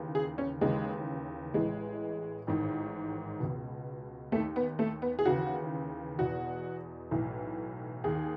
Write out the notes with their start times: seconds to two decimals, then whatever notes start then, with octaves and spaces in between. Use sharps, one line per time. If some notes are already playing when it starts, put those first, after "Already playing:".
Already playing: D#2 C#3 E3
0.15 G#4
0.38 C#4
0.61 D#2 C#3 E3 G#3
1.54 A1 A2 E3 G#3
2.47 A1 G#2 D#3
3.40 C#2 B2
4.32 D#2 D#3 A3
4.56 B3
4.79 A3
5.02 B3
5.19 G#4
5.25 D#2 C#3 E3 F#4
6.18 E2 B2 F#4
7.11 B1 A2 E3
8.04 D#2 D#3 G#4